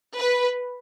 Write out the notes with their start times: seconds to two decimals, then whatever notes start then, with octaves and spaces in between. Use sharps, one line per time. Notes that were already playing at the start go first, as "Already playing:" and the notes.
0.16 B4